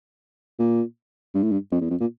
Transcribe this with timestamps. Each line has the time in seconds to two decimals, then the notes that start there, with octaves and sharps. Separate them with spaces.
0.59 A#2
1.35 G2
1.43 A2
1.51 G2
1.72 F2
1.81 E2
1.90 F2
2.00 A#2